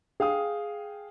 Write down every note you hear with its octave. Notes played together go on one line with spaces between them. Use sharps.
G#4 F5 G5 D#6